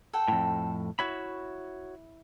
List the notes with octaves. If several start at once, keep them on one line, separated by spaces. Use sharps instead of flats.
A4 F#5 G5
F2 A2
E4 F#4 C#5 B5